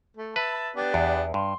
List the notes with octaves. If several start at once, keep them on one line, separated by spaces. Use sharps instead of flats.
A3
B4 E5 A5 B5
B3 D4 G4
E2
G2 C6